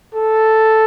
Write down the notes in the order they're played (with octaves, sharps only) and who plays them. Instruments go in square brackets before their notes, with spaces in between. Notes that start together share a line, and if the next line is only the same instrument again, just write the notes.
[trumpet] A4